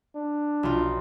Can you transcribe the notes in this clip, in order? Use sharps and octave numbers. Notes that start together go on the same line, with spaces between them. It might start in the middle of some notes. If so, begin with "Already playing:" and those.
D4
B1 F4